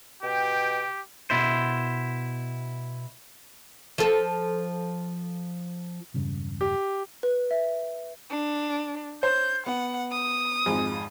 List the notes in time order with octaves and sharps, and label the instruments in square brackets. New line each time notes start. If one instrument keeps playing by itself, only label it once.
[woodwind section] B2 G5 [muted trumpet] G4
[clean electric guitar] B2 E4 C5
[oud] F3 A4
[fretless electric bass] E1 G2 C#3
[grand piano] G4
[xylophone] B4
E5
[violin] D4
[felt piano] C5 C#5 [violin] G6
[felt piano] B3 [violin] F#5
[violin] D#6
[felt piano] G#1 F2 G#3